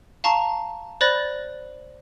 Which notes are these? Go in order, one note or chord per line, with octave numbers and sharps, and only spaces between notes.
F5 A5 A#5 C#6
C5 D5 B5 F#6 A6 A#6